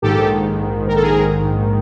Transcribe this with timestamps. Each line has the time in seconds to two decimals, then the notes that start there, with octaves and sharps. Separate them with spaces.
0.02 A#1 G#2 D#3 G4 A4
0.88 A#4
0.95 A4
1.02 G#4 A#4